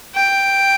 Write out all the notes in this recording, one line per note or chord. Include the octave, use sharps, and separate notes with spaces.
G5